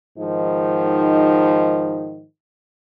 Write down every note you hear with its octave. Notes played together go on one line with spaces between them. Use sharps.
G#2 D#3 F3 D#4